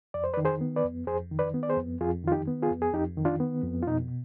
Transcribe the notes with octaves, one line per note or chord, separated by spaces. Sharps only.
F2 D5
C5
B4 D5
D#3
G#4 C5
B3
B4 D5
F2
F2 G#4 C5
D#3
B4 D5
B3
D5
G#4 C5
F2
F2 F4 G#4
D#3 F4
D#4 G4
B3
F4 G#4
F2
G#4
F2 D#4 G4
D#3
D4 F4
B3
F2
F4
B2 D#4